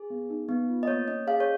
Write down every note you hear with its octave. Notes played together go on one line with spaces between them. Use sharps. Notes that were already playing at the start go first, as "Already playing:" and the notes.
Already playing: G#4
B3
D#4
B3
F4
D#5
A#3 C#5
C#4 D#5
G#4 F5
C#5